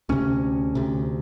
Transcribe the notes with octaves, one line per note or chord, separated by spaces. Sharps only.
D2 C3 C#4
D2 C3